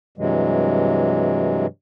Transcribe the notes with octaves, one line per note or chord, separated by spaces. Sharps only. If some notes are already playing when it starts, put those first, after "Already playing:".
G2 C3 E3 F#3 G#3